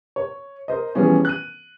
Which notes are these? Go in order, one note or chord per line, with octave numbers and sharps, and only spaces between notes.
C#5
A#4 C5 D#5
B2 E3 F3 G3 C#4 G#4
F#6 D#7